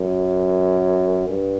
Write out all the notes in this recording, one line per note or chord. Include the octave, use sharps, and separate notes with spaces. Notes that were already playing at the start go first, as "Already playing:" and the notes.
Already playing: F#2
G2